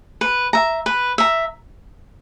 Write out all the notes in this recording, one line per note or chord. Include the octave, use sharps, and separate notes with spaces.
B4
E5 A#5
B4
E5 A#5